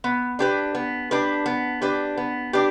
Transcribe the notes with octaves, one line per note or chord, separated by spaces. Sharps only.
B3
D4 G4 B4
B3
D4 G4 B4
B3
D4 G4 B4
B3
D4 G4 B4